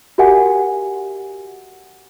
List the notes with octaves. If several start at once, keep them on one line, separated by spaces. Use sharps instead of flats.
F#4 G4 A#4 E5 F#5 G#5